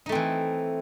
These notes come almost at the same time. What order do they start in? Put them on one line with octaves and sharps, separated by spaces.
D#4 A3 C4 E3